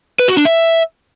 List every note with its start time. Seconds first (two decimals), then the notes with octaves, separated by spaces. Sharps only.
0.19 B4
0.28 F#4
0.37 D4
0.45 E5